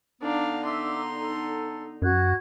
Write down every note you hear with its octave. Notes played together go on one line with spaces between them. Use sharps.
D3 B3 D4 D#4 F5
E5 C6 D6 E6
A4
F#2 F#4 F#6 G#6